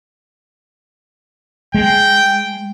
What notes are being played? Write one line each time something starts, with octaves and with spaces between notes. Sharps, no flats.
G#3 G5